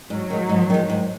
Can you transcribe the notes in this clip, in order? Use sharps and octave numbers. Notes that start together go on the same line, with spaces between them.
G#2 F#3
D#3 G#3
G#2
D#3 G#3
G#2